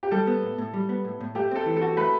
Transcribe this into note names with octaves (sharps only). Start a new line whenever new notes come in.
G4
G3 A4
B3
A2
A2
G3
B3
A2
A2
A3 G4
C4 A4
E3
A4
F#4
A3 B4